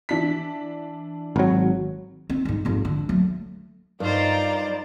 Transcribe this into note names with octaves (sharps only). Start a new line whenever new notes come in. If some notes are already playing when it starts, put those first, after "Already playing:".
E3 D4 B6
G#1 F#3
C4
G#2 G3
G#1 F2
D3
F#3 A3
G2 D#4 F4 A#4 C5 D5 A#5